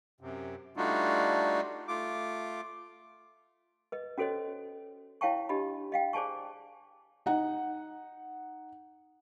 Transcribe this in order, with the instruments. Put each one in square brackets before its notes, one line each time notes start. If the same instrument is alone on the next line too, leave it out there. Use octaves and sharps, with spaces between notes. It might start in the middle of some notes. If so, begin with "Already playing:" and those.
[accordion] F#2 C3
G3 A3 D4 D#4 F4 F#4
A3 F4 D6
[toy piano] B4 D#5
C#4 F#4 A4 C5 C#5 D#5
E4 C#5 F5 G5 A5 C#6
D4 G4 D#5 B5
D#5 F5 G5
G#4 C5 D5 G#5 A5 C#6
[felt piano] D#4 F#5